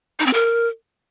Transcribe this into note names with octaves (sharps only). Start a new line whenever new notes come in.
D#4
C4
A#4